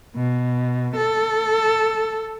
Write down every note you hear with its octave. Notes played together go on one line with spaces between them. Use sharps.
B2
A4